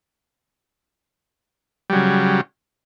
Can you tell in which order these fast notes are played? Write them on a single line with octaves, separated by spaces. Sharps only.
G3 F#3 C#3